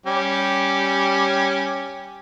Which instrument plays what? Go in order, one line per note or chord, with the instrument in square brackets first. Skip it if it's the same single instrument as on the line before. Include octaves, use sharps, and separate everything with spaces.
[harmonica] G3 C#4 G4